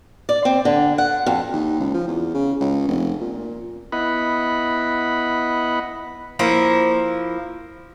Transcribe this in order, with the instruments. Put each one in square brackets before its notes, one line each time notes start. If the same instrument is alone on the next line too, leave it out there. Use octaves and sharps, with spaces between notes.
[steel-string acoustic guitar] D5
C4
D3
F#5
F2
[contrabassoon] D#2
C#2
F3
E2
C#3
C#2
F1
A#2
[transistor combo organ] B3 E4 D#5 F#5 B5
[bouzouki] F3 A#3 E4